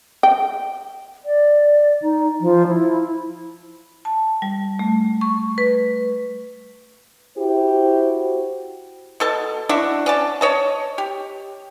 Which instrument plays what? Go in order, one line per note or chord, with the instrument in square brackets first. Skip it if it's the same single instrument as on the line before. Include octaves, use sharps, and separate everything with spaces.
[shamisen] G5
[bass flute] D5
D#4
F3
E4
[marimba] A5
G3
A3
C#6
B4
[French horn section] E4 F#4 G4 C5
[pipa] B2 A4 A5
D4 E4 F#4
C#4 D5 A5
C#5 D#5 A5
G4